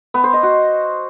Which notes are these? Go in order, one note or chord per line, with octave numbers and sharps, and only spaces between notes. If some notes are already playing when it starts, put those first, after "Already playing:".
B3
C5
D#5
F#4